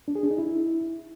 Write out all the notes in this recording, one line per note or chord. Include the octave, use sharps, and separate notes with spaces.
D4
G#4
D4
D#4
E4